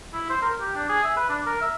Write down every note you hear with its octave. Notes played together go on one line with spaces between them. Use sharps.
E4
C5
A#4
G4
D4
G#4
E5
B4
D4
A#4
E5